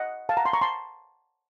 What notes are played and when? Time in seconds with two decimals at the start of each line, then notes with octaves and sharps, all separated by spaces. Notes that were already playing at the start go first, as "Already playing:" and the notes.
Already playing: D#5 F#5
0.29 F5 A5
0.37 F#5 A#5
0.45 A5 C6
0.53 A#5 C#6
0.61 A5 C6